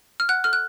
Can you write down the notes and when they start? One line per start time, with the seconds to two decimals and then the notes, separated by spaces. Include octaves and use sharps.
0.20 F6
0.29 F#5 F#6
0.44 A4 F6
0.53 F#6